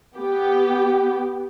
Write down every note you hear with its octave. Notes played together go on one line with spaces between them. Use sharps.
B3 G4